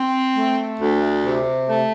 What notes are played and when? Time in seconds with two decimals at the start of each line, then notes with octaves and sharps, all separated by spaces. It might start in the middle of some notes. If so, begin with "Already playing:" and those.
Already playing: C4
0.36 A3
0.80 D2
1.25 C3
1.68 A3